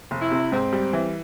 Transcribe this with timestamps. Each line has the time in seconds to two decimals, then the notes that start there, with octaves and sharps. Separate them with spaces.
0.11 F1
0.21 E4
0.31 C3
0.52 G#2 C4
0.73 G3
0.93 E3